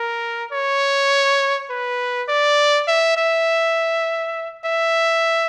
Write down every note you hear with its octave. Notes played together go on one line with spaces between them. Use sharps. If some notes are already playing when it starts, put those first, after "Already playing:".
Already playing: A#4
C#5
B4
D5
E5
E5
E5